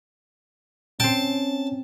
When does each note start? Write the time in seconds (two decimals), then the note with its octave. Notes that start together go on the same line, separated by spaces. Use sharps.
1.00 C4 C#4 G5 A5